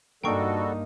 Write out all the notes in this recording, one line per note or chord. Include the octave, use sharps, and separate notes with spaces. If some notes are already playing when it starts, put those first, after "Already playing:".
G2 G3 A#3 D#4 F#4 A4 G5 C#6